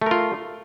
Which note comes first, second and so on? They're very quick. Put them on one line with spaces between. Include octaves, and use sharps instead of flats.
A3 A#4 F4